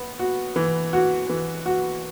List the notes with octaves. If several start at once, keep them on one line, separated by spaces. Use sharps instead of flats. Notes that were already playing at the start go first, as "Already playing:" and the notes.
Already playing: B3
F#4
E3
F#4
E3
F#4